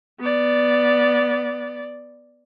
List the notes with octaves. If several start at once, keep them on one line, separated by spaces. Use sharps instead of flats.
B3 D5